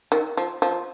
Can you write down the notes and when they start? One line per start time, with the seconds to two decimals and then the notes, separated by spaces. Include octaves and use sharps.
0.12 D#3
0.37 F3
0.62 F3